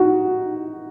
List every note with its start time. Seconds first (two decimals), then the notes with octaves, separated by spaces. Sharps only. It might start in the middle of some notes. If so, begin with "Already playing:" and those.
Already playing: D#4 F#4